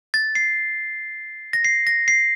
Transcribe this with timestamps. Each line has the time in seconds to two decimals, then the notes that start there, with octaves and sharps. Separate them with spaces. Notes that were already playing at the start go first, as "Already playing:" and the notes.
0.14 A6
0.35 C7
1.53 A#6
1.65 C7
1.87 A#6
2.08 C7